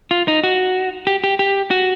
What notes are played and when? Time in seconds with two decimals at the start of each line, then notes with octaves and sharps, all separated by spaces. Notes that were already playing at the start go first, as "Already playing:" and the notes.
0.11 F4
0.28 D#4
0.44 F#4
1.07 G4
1.24 G4
1.39 G4
1.71 F#4